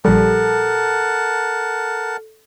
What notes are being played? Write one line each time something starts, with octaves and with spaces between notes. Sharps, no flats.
A#1 G3 A4 A#4 F#5 A5